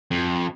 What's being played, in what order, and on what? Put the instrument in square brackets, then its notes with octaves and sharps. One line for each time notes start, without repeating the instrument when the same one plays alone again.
[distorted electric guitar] F2